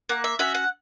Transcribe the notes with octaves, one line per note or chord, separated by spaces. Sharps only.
A#3 F#5
E5
C#4 F#4 E5
F#5